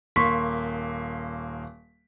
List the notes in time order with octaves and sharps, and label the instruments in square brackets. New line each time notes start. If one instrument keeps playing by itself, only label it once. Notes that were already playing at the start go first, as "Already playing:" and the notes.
[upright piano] D#1 A#3 C6 C#6 B6